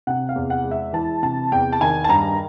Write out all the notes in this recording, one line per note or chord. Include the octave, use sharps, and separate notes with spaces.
C3 F#5
F5
E2
F#5
G#3
E5
E3 A5
C3 A5
E2 G5
A5
D#3 G#5
A5
G2 A#5